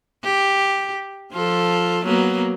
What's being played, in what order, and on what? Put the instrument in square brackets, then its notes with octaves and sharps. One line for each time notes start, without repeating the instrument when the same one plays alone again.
[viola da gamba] G4
F3 F4 A4
F#3 A#3 B3